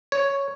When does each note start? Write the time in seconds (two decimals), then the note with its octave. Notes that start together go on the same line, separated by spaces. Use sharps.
0.12 C#5